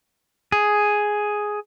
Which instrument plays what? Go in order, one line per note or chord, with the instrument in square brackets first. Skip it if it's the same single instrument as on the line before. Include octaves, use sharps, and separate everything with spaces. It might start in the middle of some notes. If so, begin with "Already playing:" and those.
[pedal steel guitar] G#4